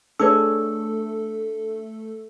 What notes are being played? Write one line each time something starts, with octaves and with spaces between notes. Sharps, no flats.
A3 D4 G#4 A4 B4 C#5 E6